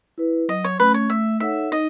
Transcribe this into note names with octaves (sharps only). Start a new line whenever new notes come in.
E4 B4
F#3 D#5
C#5
A3 C#4 B4
C#5
A3 E5
D#4 A4 C#5 E5 F#5
D#4 D#5